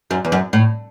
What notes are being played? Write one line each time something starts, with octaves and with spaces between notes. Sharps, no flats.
F#2
E2
F#2
A2